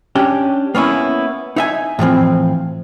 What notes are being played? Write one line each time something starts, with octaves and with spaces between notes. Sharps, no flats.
C#4 D4 G4
A#3 B3 C#4 E4
D#4 E5 G#5
A2 E3 F3 C4